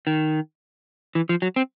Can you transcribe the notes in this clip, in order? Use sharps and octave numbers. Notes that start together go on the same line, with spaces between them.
D#3
E3
F3
F#3
C4